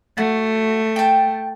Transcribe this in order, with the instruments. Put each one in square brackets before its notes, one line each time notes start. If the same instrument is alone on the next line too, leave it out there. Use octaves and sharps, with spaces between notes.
[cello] A3 [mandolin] F#4
[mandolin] G5 A5